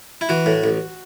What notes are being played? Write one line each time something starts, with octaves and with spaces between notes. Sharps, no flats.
E4
E3 F#4
A2
A1